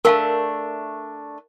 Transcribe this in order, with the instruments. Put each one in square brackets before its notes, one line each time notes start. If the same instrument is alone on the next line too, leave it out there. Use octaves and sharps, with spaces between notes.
[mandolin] A3 D4 [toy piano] A#4 F5 A5